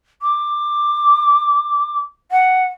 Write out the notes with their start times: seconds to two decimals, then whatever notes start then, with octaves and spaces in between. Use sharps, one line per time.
0.22 D6
2.31 F#5